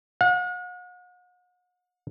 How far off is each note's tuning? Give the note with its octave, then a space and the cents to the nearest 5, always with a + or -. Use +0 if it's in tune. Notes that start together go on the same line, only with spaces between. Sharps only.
F#5 -40